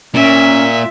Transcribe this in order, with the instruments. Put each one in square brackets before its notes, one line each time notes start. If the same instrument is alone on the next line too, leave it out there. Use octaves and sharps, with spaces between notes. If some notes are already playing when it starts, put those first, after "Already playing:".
[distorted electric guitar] A#2 [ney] C#4 [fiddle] E5